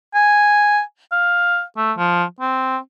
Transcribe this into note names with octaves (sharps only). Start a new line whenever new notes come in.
G#5
F5
A3
F3
C4